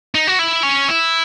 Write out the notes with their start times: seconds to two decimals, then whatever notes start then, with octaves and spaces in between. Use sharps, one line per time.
0.15 D#4
0.27 F#4
0.39 E4
0.63 C#4
0.88 E4